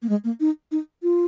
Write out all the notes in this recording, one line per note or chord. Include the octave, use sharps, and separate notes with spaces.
A#3
G#3
A#3
D#4
D#4
F4